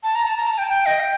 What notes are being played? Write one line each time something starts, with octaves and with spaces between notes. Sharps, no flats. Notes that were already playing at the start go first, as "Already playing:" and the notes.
A5
A#5
A5
A#5
A5
G5
A5
G5
D#5
G5